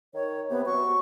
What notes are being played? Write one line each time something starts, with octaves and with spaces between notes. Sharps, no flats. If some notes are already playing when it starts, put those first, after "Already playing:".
D#3 C#5
C3 B3
F#3 C#6